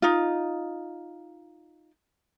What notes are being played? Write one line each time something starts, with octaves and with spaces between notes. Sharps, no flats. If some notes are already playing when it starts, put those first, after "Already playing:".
D#4 F4